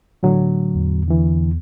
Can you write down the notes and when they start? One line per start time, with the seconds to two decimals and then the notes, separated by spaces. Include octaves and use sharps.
0.23 A2 D3 F#3
0.75 E2
1.08 D3 E3